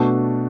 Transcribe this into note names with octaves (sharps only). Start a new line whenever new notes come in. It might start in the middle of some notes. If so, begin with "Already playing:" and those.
Already playing: B2 A3 D4 F#4